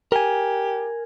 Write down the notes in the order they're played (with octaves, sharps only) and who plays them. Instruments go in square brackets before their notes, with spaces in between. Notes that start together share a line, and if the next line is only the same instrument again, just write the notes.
[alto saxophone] G4 [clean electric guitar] A#4 G#5